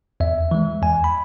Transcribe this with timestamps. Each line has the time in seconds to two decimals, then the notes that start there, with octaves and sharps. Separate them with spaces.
0.20 E2 E5
0.51 E3 G#3
0.82 E2 G#5
1.04 B5